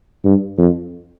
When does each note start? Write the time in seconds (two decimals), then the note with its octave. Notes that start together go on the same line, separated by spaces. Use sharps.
0.25 G2
0.58 F2